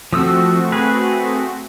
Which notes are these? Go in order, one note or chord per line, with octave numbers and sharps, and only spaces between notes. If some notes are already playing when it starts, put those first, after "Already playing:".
F3 A3 C4 F#4 D#6 E6
G#4 B4